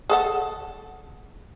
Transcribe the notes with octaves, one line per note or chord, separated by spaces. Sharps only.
G#4 A4 F#5